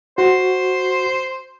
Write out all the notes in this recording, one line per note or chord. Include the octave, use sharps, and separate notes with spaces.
F#4 C5